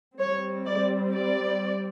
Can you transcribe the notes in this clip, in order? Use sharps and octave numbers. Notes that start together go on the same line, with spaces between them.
G3 C4 C#5
D5
D5